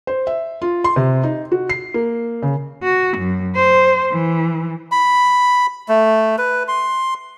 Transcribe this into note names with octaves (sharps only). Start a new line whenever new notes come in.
C5
E5
F4
C6
C3
D#4
F#4
C7
A#3
C#3
F#4
F#2
C5
E3
B5
A3
B4
C6